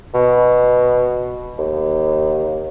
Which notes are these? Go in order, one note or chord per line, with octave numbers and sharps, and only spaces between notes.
B2
D#2